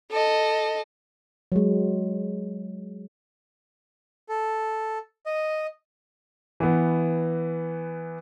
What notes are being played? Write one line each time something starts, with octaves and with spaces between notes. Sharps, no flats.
A4 D#5
F#3 G#3
A4
D#5
E3 B3